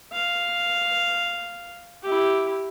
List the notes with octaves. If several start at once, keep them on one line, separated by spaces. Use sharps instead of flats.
F5
E4 G4